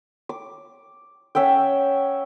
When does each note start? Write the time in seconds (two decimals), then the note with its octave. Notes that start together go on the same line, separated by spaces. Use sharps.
0.29 D6
1.35 C#4 E5 F#5 G5